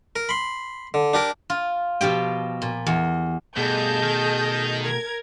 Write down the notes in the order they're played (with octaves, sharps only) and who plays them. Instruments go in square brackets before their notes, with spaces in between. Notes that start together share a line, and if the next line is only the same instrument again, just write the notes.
[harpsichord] A#4
B5 C6
D3
D4 G4 A#4
[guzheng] F4
B2 F3 G4 G5
A#2
E2
[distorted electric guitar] G2 [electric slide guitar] B2 A3 [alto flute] G#4 [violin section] D#5 A5 G6
[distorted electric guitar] D#3
[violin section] A#4 G#6